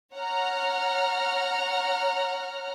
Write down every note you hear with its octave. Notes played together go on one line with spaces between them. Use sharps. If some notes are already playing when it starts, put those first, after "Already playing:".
C#5 F#5 A#5 F6